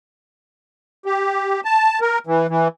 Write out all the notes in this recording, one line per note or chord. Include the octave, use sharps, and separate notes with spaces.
G4
A5
A#4
E3
E3